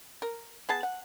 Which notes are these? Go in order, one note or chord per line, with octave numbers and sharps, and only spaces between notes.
A#4
B3 G#4 A5
F#5